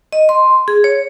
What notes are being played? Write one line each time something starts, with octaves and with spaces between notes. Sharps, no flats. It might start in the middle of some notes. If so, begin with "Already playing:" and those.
D#5
C6
G#4
C#5